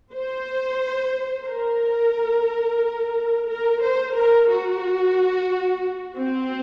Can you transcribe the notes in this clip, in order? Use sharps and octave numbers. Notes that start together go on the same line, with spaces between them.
C5
A#4
A#4
C5
A#4
F#4
C4